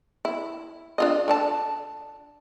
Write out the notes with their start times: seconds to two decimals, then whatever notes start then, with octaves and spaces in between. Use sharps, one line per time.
0.25 E4
0.98 D4 F4 D#5
1.28 D3 D4 A5